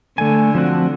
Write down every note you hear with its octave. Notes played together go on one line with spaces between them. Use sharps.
D3 A3 G#5
F3 C4 F#4